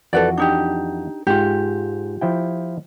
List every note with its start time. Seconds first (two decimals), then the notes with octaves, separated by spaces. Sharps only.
0.13 F2 E3 F#4 A4 B4 D5
0.38 D4 D#4 G4
1.27 G#2 F4 G4
2.21 F3 E4 G5